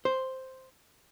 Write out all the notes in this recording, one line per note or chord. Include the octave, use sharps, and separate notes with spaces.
C5